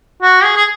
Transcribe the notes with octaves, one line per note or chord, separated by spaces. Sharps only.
F#4
G#4
G#4